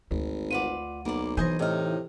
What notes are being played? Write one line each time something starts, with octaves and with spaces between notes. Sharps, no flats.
G#1 D2
F4 B4 D5 F#5 D#7
B1 A#3 D5
E3 C5 D#5 G#5 G6 A#6
A2 C3 D#4 A4 D#5 F6